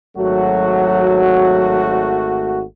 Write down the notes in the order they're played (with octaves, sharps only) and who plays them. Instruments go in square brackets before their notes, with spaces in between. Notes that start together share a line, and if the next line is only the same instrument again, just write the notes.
[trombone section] G#1 A3 F#4 [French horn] F#3